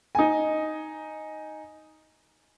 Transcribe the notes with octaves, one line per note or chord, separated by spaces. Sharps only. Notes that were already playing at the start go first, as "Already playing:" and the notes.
D#4 G#5